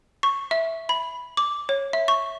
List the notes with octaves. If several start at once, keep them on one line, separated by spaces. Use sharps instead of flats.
C#6
E5
B5
D6
C#5
E5
C#6